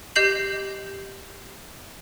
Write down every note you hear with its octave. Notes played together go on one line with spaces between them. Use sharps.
G4 D#5 G6 C7 F#7